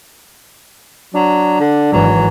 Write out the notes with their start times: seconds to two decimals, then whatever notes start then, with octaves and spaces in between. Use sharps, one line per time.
1.14 F#3 D4
1.60 D3
1.92 G#1 E3 F#3